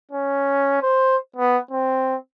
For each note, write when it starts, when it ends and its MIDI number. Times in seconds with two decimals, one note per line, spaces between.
0.11 0.79 61
0.82 1.17 72
1.36 1.58 59
1.71 2.16 60